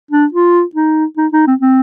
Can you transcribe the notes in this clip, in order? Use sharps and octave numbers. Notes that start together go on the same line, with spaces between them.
D4
F4
D#4
D#4
D#4
C4
C4